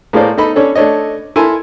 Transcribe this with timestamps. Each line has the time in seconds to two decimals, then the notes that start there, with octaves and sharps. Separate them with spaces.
0.13 A2 A#3 G#4 C5 D5
0.38 D#4 A4 D#5 B5
0.56 C#4 D4 A4 C#5
0.76 A3 D4 C#5 D#5
1.36 E4 A4 A#4 G#5 C6